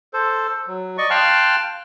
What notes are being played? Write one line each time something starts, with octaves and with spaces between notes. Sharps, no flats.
A4 C5
F#3
D5 D#5 C#6
F5 G5 A5 C6 F6 F#6